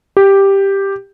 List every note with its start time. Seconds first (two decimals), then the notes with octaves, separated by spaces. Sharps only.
0.17 G4